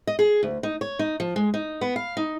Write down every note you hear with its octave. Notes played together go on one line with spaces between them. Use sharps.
D#5
G#4
D2
D#4
C#5
D#4
F3
G#3
D#4
B3
F5
D#4